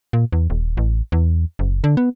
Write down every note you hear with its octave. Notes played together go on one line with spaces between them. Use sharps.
A#2
E2
D#1
A1
E2
F#1
D3
B3